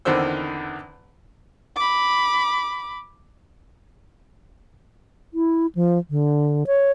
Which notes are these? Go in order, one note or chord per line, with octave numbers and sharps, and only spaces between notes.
E2 D3 D#3 C4 C5 E6
B5 D6
E4
F3
D3
C#5